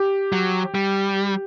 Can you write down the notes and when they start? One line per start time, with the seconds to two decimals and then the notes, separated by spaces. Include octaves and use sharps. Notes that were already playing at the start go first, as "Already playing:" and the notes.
Already playing: G4
0.32 F#3
0.75 G3